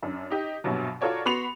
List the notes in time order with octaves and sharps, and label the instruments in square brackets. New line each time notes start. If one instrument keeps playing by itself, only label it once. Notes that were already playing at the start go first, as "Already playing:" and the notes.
[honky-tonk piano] F#2 D4
D#4 G4 D#5
A#1 G2 B2 F#3
F4 F#4 A4 A#4 C#5 D5
B3 F#4 B5 C6 C#7 F7